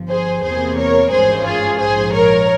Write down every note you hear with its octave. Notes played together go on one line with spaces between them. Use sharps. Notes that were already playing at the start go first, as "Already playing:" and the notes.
Already playing: G1 G2 F3
G#4 C5
E2 C3 E3 A#3 G#4 C5
A#4 C#5
G#1 G2 E3 G#3 C#4 G#4 C5
F4 G#4
A#1 G#2 F3 G#4 C5
A#4 C#5